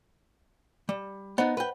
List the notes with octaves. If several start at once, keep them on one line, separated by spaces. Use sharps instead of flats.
G3
B3 D#4 C5 D#5 F#5
B4 G5